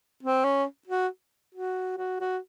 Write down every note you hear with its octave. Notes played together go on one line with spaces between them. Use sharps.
C4
C#4
F#4
F#4
F#4
F#4